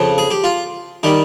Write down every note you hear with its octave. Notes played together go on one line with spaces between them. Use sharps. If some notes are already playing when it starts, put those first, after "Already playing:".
Already playing: F2 C#3 F3
G#4
G4
F4
D#3 G3 G4